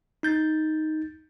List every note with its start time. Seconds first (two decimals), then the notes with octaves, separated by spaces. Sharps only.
0.23 D#4 G6 A6